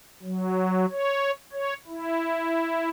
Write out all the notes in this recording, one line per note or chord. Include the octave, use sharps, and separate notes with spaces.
F#3
C#5
C#5
E4